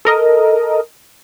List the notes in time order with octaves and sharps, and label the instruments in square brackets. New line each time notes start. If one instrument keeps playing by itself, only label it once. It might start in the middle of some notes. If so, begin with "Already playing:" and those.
[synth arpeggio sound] A4 A#4 D#5